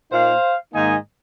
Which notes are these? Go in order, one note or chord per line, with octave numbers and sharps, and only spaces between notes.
A#2 A#3 D#4 C5 F5
G#2 D#3 A#3 D#4 D#5 G#5